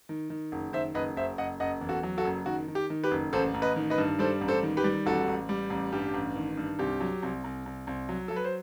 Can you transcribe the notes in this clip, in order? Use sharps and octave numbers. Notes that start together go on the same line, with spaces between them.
D#3
D#3
F#1
D#3 C5 E5
F#1 B4 D#5
F#1 C5 E5
F#1 D#5 F#5
F#1 D#5 F#5
E2
F#4 A4
F#3
F#4 A4
F#1
D#3 F#4
D#3
G4
D#3
G4 B4
F#1
A1 A4 C5
A1
B4 D#5
D#3
B4 D#5
G2
G3 A4 C5
A1
A4 C5
D#3
G4 B4
G3
A1 F#4 A4
A1
G3
A1
G2 G4
A1
D#3
G2
C2 G4
F#3
C2
C2
C2
C2
F#3
F#3 A4
B4
C5